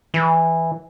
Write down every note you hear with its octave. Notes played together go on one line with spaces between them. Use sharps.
E3